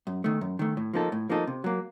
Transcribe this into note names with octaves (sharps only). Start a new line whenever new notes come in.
F#2
D#3 A3
F#2
D#3 A3
A2
F3 A#3 D#4 A4
A2
F3 A#3 D#4 A4
C3
F#3 A#3